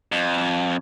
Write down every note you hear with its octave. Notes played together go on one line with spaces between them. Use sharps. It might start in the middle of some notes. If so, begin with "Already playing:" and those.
F2